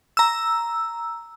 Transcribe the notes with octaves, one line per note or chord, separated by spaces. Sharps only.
A#5 E6